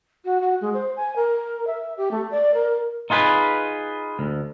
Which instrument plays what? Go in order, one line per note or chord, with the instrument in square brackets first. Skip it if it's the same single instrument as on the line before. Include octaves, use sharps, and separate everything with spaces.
[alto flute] F#4
F#4
G#3
C5
G#5
A#4
E5
G4
A3
D5
A#4
[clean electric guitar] D#4 F4 G#4 B4
D2